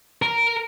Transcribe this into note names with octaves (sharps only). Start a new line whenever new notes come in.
A#4